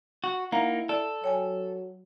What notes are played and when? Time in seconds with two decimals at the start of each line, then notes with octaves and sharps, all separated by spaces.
0.24 F#4
0.52 A#3 D#4 E4 F5 F#5 A#5
0.89 A4 D5
1.24 F#3 C#5 G5 G#5